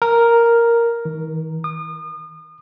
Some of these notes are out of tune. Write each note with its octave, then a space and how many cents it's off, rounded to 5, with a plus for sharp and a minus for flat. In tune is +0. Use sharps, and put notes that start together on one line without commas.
A#4 +0
D#3 +45
D#6 -35